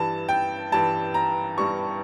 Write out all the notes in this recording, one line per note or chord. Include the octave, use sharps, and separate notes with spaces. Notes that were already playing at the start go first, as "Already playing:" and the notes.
Already playing: G2 E3 G3 A5
G5
G2 E3 G3 A5
A#5
G2 E3 G3 C#6